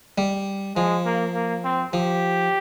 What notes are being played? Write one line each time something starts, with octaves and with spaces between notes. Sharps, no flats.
G3
F3 G#3
A#3
A#3
C4
F3 G4